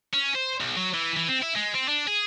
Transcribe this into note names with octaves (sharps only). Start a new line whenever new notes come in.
C#4
C5
B1
F#3
E3
E3
C4
E4
G#3
C4
D4
G#4